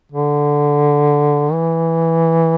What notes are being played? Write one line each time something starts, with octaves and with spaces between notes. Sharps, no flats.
D3
E3